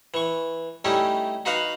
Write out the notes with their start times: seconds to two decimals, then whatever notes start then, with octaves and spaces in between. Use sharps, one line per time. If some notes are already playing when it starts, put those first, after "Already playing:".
0.14 E3 C#6
0.85 G3 A3 C#4 D#4 E4 G4
1.45 D#4 F#4 B4 F5 F#5 B5